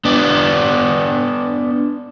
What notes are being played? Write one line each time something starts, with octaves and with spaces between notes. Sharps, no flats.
B3 D4